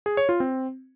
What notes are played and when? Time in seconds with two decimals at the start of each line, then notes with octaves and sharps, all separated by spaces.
0.06 G#4
0.17 C#5
0.29 F4
0.40 C4